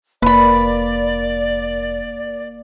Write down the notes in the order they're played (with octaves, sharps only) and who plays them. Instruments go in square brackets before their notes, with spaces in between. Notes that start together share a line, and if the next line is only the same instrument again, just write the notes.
[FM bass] F1 [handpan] A#3 [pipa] B4 B5 [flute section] D5